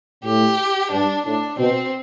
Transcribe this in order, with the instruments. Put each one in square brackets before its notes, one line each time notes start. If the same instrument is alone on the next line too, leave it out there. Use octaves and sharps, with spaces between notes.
[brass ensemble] A2 [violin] G4
[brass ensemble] G2 [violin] D4
[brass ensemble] A2 [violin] D4
[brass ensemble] B2 [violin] C4